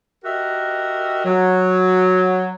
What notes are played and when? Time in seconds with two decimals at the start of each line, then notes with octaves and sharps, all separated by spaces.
0.24 F#4 G4 A#4 D#5 E5
1.25 F#3